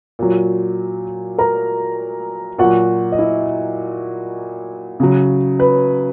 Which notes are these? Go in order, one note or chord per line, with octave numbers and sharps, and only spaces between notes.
A#2 F#3
A#4 A#5
A#2 F#3 F#4 F#5
D#5
E4 E5
C#3 F#3
B4 B5